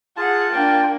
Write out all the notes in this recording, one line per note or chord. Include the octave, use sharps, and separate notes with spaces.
F4 G#4 F#5 A5
A#3 D4 G5